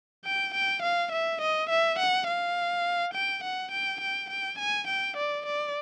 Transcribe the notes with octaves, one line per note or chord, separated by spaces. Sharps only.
G5
G5
F5
E5
D#5
E5
F#5
F5
G5
F#5
G5
G5
G5
G#5
G5
D5
D5